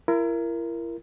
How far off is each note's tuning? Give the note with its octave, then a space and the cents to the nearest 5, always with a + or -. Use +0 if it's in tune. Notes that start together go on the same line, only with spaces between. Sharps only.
E4 +35 A#4 +0